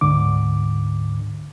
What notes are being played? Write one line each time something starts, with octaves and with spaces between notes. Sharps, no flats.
D2 G#2 D3 D6